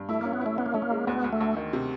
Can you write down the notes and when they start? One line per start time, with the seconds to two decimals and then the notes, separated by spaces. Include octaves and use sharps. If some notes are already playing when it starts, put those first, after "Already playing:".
Already playing: G2
0.09 A3 E4
0.21 A#3 C#4
0.33 B3
0.41 A3 E4
0.58 B3 C#4
0.66 A#3
0.74 A3 C#4
0.82 A#3
0.91 G#3
1.07 D2 B3
1.24 D2
1.33 A3
1.41 D2
1.57 D#3
1.73 C3